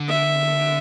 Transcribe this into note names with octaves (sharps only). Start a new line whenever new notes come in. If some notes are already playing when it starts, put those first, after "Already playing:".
Already playing: D3
E5